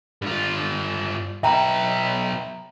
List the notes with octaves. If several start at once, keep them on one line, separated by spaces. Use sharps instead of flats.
G2 F4
B1 B4 E5 G5 A#5